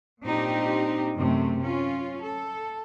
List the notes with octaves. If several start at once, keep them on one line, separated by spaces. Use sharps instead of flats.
A#2 C4 D4 D#4 G4
F#2 C3 A3
C#4 F4
A4